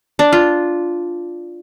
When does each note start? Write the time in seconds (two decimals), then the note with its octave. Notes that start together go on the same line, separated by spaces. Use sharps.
0.19 D4
0.33 F4